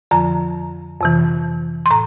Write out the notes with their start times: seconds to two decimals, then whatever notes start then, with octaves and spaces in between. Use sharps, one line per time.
0.11 F2 D3 F3 A#5
1.01 F2 C3 E3
1.86 C6
1.91 A2 A#5